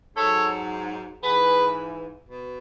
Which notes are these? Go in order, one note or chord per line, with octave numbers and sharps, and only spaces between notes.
G#2 F#3 A4 C#5
G#2 E3 G#4 B4
B2